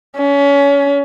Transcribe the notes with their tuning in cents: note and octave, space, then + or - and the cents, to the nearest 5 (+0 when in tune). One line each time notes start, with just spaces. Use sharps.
C#4 +30